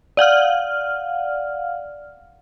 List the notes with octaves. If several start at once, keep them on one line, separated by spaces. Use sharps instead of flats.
D5 F5 F#5 F6